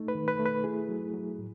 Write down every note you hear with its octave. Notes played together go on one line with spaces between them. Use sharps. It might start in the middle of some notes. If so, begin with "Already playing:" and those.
Already playing: A3 D#4
B4
D#3
B4
A3
B4
E4 G#4
F#3
F#3
A2